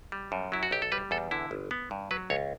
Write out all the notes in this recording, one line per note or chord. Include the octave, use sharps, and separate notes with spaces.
G3
F#2
F#3 E4
F#4
B1 G4
A4
G3 B4
E2 A4
D3 E4
G1
B3
G2
F#3 B4
C#2 C#5